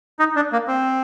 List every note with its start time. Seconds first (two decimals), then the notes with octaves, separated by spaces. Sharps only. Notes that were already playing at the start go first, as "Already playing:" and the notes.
0.19 D#4
0.36 D4
0.52 A#3
0.67 C4